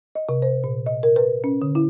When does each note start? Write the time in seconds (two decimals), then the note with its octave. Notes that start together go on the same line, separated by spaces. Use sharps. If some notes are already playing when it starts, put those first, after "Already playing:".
0.15 D#5
0.29 C3
0.42 C5
0.64 A#2
0.86 D#5
1.03 A#4
1.16 B4
1.44 C#4
1.62 D3
1.75 E4